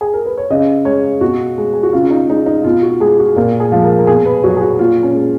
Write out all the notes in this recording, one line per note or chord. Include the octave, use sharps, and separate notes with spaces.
G#4
A#4
B4
C#5
C#3 D#5
G#3 C#5
B2 F#4
G#3
G#4
F#4
C#3 F4
D#4
G#3 D#4
D#4
B2 F4
F#4
G#3 G#4
F#4
A#2 A#4
G#4
F3 G#3
A#4
A#4
B2 G#4
B4
F#3 F#4
G#4
F#4
A#2 F4
C#4
G#3